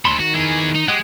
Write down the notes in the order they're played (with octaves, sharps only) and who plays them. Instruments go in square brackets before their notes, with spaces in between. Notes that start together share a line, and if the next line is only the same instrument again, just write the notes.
[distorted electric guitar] D2 A4 [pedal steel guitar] B5 C6
[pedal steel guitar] D#3 [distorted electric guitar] F#4
[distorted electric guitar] E3 G#4
D#4
[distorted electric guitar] G#3 [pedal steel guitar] G4 D#5 F#5